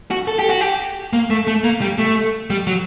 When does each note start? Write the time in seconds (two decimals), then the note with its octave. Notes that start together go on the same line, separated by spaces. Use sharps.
0.11 F#4
0.28 A4
0.39 G4
0.50 F#4
0.60 G4
1.13 A#3
1.30 A3
1.47 A3
1.64 A#3
1.81 G3
1.98 A3
2.50 G3
2.67 F#3